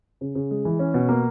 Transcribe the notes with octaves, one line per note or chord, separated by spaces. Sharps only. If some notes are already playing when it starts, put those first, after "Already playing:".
C#3
C#3
G#3
E3
C#4
B2
A#3